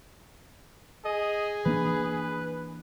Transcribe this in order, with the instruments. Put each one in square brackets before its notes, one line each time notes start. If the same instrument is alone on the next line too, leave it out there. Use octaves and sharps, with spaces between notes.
[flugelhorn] G#4 [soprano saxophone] D#5
[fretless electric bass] E3 A#3 D4 [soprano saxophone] B4